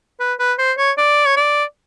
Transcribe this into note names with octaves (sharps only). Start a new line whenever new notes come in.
B4
B4
C5
C#5
D5
C#5
D5